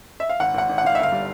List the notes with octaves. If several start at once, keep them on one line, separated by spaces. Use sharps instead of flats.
E5
F5
G#1 F#5
G#1 F#5
G#1
F#5
G#2 F5
E5
G1 F5
G3